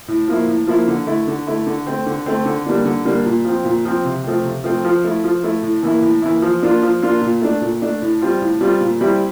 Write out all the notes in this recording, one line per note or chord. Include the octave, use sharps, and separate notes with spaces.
A2
F3 A#3 E4
A2
F3 A#3 E4
D3
A3 E4
D3
A3 E4
D3
A3 C4
D3
A3 C4
D3
G3 A#3 D4
D3
G3 A#3 D4
A#2
F3 C4
A#2
F3 C4
C3
F3 A3 C4
C3
F3 A3 C4
F3
A3 E4
F3
A3 E4
A2
E3 A#3 E4
A2
E3 A#3 E4
F3
A#3 D4 F4
F3
A#3 D4 F4
A#2
A3 D4
A#2
A3 D4
A2
G3 C4 F4
A2
G3 C4 F4
A#2
G3 C4 E4